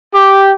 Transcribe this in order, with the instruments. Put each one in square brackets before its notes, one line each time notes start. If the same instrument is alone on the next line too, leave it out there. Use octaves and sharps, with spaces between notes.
[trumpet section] G4